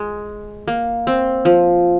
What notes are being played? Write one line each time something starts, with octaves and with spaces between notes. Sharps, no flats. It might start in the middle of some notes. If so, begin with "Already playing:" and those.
Already playing: G#3
A#3
C4
F3